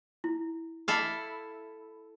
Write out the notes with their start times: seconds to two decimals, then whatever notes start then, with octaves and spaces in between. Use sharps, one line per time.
0.24 E4
0.88 E4 A4 F5 D6